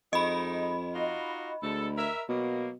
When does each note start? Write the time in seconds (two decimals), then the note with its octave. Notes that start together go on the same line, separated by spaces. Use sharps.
0.13 F2 G#3 D#4 D#5 B5
0.94 D#4 F4 F#4
1.63 D2 G#3 A4
1.97 A#4 E5
2.29 B2 F#3 A#3